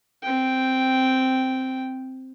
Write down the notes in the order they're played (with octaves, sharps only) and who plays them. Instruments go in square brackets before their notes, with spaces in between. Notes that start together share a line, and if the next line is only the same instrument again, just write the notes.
[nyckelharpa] C4 G5